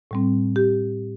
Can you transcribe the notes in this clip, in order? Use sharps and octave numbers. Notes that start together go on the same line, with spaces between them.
A2 G3 C4
G4